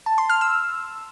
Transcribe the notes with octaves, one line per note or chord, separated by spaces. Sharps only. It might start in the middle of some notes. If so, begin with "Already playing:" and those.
A5
C6
F6
E6